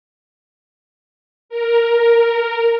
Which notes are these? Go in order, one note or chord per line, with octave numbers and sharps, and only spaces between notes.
A#4